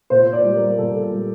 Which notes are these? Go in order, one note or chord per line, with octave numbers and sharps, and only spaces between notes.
A#2 C5
D5
G3
A#4
A#2 A4
G3